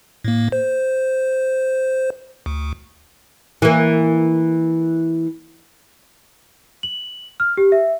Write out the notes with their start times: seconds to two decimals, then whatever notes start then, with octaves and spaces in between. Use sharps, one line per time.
0.24 A2 A#3
0.52 C5
2.46 D2
3.62 E3 A#3
6.83 F#7
7.40 F6
7.57 G4
7.72 E5